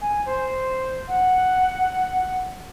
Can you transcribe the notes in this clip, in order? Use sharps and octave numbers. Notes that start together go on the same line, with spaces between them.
G#5
C5
F#5